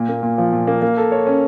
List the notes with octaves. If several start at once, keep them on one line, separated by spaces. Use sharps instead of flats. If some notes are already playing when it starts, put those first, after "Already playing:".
Already playing: A#2
A#3
A#2
F3
A#2
A#3
A#3
A4
C#5
C#4